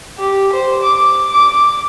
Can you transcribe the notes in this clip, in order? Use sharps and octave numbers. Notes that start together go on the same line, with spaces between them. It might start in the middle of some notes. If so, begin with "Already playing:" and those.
G4
C5
D6
D6